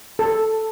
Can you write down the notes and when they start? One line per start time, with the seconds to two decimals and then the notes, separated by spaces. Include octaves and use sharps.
0.19 A4